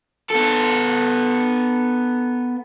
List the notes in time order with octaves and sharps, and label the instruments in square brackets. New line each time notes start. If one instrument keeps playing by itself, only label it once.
[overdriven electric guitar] B3 A4